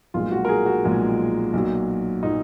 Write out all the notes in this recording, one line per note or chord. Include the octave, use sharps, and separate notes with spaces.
B1 A#2 F3 G#3 F4
F#4
A#4
G#4
F#4
B1 A#2 F3 G#3
B1 A#2 F#3
A#2 F#3 D#4